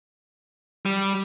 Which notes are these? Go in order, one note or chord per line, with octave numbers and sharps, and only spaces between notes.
G3